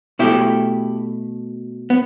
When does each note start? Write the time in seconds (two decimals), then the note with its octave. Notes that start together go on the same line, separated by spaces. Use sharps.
0.19 B2 A3 E4 G4
1.90 B3